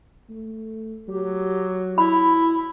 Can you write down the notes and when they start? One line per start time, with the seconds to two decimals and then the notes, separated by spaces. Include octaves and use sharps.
0.29 A3
1.08 F#3 G4
1.98 E4 B5